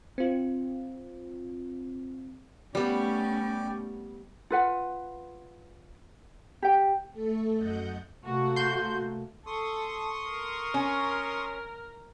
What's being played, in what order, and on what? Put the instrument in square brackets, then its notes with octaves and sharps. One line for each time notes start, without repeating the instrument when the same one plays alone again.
[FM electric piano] C4 F4
[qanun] G3 B3 [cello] A3 C#4 [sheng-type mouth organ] G4 D5
[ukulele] F4 B4 F#5
G4 G5
[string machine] A3 A4
F#2 D#5 F#5 G6
[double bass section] C3 A3 A#3 [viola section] F#4
[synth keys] C6 G6
[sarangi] A4 [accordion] C6 C#6 D#6
[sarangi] A#4
[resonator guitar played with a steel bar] C#4